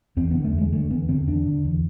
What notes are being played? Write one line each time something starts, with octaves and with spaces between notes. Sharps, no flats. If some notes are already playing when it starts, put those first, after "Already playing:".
E2 C4
B3
D3
A3
E2
G#3
D3 A3
E2 B3
D3 C4
E2 D4
D3
E2